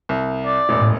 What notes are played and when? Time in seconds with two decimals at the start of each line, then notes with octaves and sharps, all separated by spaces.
0.09 C2
0.46 D5
0.69 E1 A1
0.81 A2